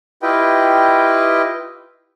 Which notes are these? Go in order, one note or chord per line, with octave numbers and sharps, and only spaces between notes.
E4 F4 G4 B4 D#5 G5